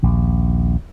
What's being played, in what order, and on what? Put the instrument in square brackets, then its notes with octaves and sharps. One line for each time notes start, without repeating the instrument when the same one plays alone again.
[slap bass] A#1 D#2